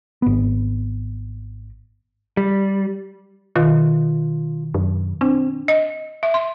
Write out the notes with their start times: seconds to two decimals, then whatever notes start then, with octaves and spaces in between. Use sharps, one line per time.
0.22 G#1 B3
2.37 G3
3.56 B2 D#3 F4
4.74 F#2
5.21 C4 D4
5.68 D#5
6.23 E5
6.34 C6